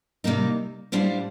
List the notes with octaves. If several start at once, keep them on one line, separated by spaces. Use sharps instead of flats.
C3 G3 A#3 D#4
A2 G3 D4 F4 C5